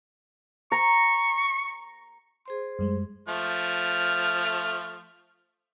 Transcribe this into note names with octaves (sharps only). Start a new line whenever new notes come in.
A#5 C#6
G#4 C5 C6
F#2 G3 G#3
F3 A3 F6